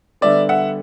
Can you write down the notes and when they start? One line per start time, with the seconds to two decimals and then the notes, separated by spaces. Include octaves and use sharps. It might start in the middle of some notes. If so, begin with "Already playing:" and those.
0.21 D3 G3 B3 D5 E5
0.49 E5 F#5